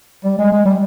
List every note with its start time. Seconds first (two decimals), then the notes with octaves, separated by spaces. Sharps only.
0.24 G3
0.39 G#3
0.52 G#3
0.66 G3